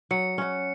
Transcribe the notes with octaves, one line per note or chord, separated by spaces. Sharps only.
F#3 C#7
C#4 F#4